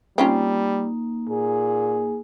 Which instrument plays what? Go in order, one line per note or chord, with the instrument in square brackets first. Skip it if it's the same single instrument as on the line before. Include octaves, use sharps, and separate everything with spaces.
[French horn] G3 [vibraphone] A#3 D#4 [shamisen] C4 C#4 F4
[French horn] A#2 [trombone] G#4